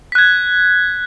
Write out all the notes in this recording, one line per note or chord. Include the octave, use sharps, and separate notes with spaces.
F#6 G#6 B6